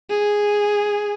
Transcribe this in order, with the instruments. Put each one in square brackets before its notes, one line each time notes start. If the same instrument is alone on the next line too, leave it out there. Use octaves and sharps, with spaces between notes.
[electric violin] G#4